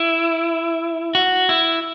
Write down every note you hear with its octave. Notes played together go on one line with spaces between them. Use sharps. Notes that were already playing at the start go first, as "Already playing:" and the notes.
Already playing: E4
F#4
E4